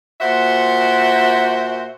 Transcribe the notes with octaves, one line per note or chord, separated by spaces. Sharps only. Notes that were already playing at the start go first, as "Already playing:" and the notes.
A#2 F#4 C5 E5 F#5